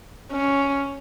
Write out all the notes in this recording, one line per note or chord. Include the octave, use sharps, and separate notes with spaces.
C#4